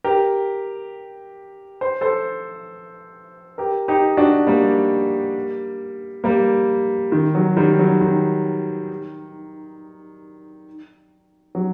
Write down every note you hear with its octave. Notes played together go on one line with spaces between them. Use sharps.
G4 A#4
C5
A4 C5
G4 A#4
D#4 G4
D4 F#4
G3 A#3
G3 A#3
D#3
F#3
D#3 G3
F#3
D#3
F#3